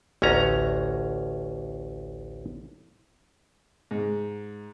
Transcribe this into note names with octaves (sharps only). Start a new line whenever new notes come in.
A1 D2 C#4 A#5
G#2